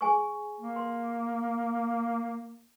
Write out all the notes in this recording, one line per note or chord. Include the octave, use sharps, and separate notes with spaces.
G#4 G#5 C#6
A#3
C6